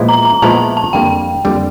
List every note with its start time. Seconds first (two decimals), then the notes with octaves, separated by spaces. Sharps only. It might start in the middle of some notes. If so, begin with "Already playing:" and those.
Already playing: A#2 F3 G#3 B3 E4
0.09 A#5
0.25 A#5
0.42 A#2 F3 G#3 B3 E4 A5
0.77 A5
0.93 F2 D3 G3 A#3 G5
1.45 F2 D3 G3 A#3